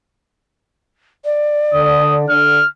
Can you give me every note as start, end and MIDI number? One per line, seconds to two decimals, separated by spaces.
1.25 2.41 74
1.74 2.26 50
1.74 2.17 87
2.30 2.59 50
2.30 2.68 89